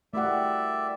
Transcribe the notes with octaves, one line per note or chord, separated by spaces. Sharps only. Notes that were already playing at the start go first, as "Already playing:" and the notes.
G3 A3 E4 A#4 D5 E5 F#5